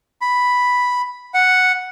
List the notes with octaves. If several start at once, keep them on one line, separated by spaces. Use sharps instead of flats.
B5
F#5